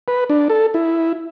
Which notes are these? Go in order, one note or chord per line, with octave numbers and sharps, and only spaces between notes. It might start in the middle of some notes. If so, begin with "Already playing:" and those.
B4
D4
A4
E4